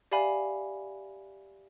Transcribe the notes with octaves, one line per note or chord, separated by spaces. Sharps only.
G4 D5 E5 F5 G#5 B5